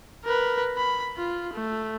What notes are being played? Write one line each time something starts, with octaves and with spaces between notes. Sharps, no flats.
A#4 B4
B5
F4
A3